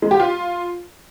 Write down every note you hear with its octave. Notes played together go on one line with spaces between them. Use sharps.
G#3
G4
F4